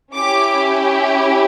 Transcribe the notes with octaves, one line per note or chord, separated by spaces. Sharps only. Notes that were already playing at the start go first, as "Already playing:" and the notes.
C#4 E4 G4 D6